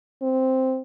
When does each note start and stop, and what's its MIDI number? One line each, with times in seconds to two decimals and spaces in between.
0.22 0.81 60